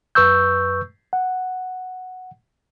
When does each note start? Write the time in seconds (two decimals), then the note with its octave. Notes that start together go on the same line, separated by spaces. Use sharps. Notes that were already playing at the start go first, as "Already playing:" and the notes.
0.15 F#2 B4 C#6 E6 G6
1.13 F#5